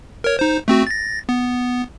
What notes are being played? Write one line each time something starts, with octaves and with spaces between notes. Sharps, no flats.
A#4 C#5
D#4 C5
A3 C4 F#4
A6 A#6
B3